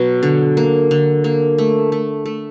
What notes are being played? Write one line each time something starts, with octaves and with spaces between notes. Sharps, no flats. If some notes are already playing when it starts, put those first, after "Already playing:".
Already playing: B2 F#3
D3
A#3
D3
A#3
A3
A3
A3